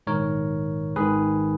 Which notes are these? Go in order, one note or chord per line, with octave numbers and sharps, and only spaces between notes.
A#1 G#2 D#3 A#4 C#5
G#1 G#2 D#3 G#4 B4